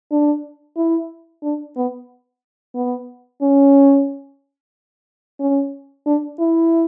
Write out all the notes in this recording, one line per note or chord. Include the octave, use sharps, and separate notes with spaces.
D4
E4
D4
B3
B3
C#4
C#4
D4
E4